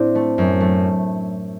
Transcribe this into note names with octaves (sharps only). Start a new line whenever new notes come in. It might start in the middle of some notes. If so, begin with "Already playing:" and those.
Already playing: A2 C4 D4 E4
A3
F#2
A3